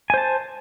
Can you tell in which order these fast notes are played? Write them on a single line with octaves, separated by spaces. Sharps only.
G#5 C5 A5